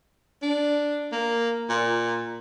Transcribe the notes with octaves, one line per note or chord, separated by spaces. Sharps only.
D4
A#3
A#2